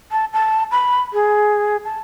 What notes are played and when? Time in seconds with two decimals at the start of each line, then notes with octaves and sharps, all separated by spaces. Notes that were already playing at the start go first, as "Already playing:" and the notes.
0.12 A5
0.33 A5
0.71 B5
1.13 G#4
1.84 A5